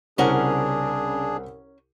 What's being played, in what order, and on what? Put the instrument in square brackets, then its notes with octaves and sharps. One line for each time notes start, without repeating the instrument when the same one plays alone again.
[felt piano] C2 C5 [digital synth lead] C#3 [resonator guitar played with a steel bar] C#4 A#4 F#5 [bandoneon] D4 G#4